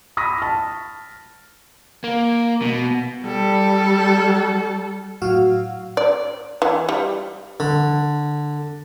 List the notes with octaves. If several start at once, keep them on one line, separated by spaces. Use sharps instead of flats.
B5 C#6 D#6 E6 A#6 B6
A5 F6
A#3
B2
G3 A4
A2 F#3 F#4 F5 E6
D5
E3
G3
D3